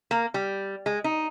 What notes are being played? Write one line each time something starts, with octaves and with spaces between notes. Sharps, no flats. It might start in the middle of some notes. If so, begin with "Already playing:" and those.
A#3
G3
G#3
D#4